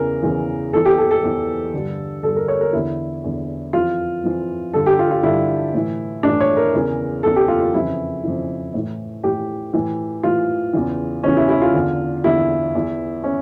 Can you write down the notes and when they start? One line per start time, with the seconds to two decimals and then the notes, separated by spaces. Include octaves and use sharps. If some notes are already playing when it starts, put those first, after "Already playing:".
Already playing: E2 C#3 E3 A#4
0.23 E2 C#3 E3
0.73 E2 E3 A4
0.85 G4
0.98 A4
1.11 A4
1.24 E2 E3
1.74 G2 D3
2.23 G2 D3 A4
2.36 A#4
2.48 C#5
2.61 A#4
2.73 E2 D3 E4
3.24 E2 D3
3.73 F2 E3 F4
4.24 F2 E3
4.73 G2 D3 A4
4.86 G4
4.99 F4
5.11 F4
5.23 G2 D3 E4
5.74 A2 E3
6.23 A2 E3 D4
6.41 C#5
6.57 A#4
6.74 E2 C#3 E3
7.23 E2 C#3 E3 A4
7.36 G4
7.48 F4
7.61 F4
7.74 F2 C#3 E3 E4
8.24 F2 C#3 E3
8.74 A2 E3
9.24 A2 E3 G4
9.74 A2 E3
10.23 A2 E3 F4
10.73 E2 C#3 E3
11.23 E2 C#3 E3 C#4
11.37 E4
11.49 E4
11.62 F4
11.74 E2 D3
12.24 E2 D3 E4
12.75 E2 E3
13.24 C#4